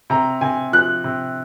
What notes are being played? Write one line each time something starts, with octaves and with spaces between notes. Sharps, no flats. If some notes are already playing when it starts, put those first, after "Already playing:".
C3 A#5
C3 G#5
F3 F#6
C3